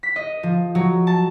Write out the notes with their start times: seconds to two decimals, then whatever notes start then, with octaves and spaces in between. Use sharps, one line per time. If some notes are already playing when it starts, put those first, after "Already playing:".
0.03 B6
0.16 D#5
0.43 F3
0.75 F#3
1.07 A5